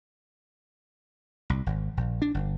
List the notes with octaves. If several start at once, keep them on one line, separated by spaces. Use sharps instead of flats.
C2
G#1
A#1
D4
G1